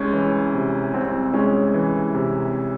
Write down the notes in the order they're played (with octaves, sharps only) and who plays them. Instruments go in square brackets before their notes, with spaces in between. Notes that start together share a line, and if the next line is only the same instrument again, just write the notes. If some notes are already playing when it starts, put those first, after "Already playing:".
Already playing: [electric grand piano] C2 G#3 [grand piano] C#4
[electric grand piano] E3
C3
[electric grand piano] C2 [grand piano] C4
[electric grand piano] G#3 [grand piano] C#4
[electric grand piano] E3
C3